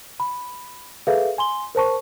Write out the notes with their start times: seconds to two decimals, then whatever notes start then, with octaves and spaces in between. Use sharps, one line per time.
0.20 B5
1.07 G#4 A4 B4 E5 F5
1.38 G#5 C6 G7
1.75 A#4 C5 A5 C#6